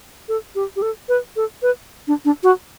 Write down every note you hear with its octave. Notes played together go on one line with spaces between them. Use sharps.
A4
G4
G4
A4
B4
A4
B4
D4
D4
F#4